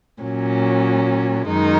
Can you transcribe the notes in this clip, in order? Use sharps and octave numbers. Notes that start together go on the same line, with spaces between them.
A#2 F#3 C#4
F#2 D#3 G#3 D#4